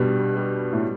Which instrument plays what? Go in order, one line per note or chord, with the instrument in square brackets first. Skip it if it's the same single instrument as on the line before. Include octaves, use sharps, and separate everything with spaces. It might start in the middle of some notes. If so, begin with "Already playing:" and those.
Already playing: [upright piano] G2 B2 [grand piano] G3
[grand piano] G3
[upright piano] A2